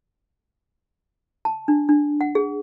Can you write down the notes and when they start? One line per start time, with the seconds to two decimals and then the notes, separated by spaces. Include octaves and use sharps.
1.45 A5
1.68 D4
1.89 D4
2.21 F#5
2.35 G#4